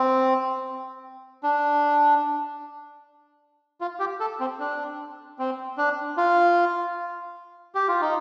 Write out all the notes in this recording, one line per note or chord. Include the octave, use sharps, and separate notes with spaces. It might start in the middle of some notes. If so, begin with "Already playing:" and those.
Already playing: C4
D4
F4
G4
A4
C4
D4
C4
D4
F4
G4
F4
D#4